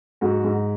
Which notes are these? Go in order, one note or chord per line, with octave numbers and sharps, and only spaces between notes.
G#2 F#4
G#2